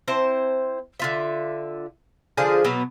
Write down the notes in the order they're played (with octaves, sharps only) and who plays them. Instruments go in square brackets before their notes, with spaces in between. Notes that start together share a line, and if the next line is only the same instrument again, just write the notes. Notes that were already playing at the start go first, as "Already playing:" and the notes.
[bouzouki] C4 E4 C5 A5
D3 F4 E5
D3 F3 D4 G#4
B2 F#3 B3